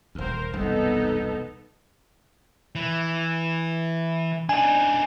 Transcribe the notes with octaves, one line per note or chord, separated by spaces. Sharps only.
D#1 D2 A#4 C5
E1 C2 F#2 B3 D#4 A4
E3
D4 D#4 G#5